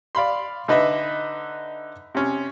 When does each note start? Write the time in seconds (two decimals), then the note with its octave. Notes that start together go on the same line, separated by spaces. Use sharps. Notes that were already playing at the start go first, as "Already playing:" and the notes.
0.15 D5 F5 B5 C6
0.68 D3 D#4 B4 D#5 E5
2.15 C3 C#4